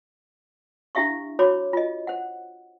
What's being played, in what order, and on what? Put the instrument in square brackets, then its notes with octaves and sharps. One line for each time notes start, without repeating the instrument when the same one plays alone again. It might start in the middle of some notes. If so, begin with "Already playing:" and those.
[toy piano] D4 E4 G4 E5 F5 C#6
E4 F#4 C5 C#5 B5 D6
F4 D#5
C5 F#5